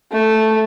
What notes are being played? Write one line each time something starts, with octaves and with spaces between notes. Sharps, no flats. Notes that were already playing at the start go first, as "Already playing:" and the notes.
A3